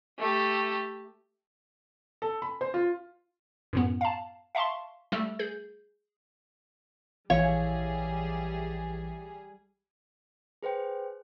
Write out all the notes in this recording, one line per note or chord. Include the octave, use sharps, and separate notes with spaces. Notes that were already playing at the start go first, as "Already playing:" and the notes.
A3 G4
A4
B5
C5
F4
F#2 A2 B3
F5 A5
E5 F5 A5 C6 C#6
G3 A3 E6
G#4 G6
A#1 E3 G3 G#4 C#5 E5 F5
G#4 B4 C5 G5